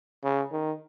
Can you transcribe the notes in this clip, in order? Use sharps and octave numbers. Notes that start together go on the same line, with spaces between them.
C#3
D#3